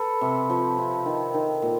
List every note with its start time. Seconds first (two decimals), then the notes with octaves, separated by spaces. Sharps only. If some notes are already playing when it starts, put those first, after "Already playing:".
Already playing: A4 B4
0.21 C3
0.50 F3
0.78 C3
1.06 D#3
1.34 D#3
1.62 A#2